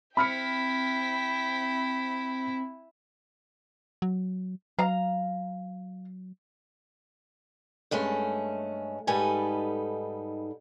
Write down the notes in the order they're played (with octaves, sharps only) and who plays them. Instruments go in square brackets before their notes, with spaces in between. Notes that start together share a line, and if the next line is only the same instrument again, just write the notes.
[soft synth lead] C4 [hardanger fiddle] E4 [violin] G5 B6 [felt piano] B5 F6 C#7
[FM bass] F#3
[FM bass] F#3 [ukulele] F5 A#5
[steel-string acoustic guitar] G2 G#3 A3 C#4
G#2 G3 D#4 A4 B4 G#5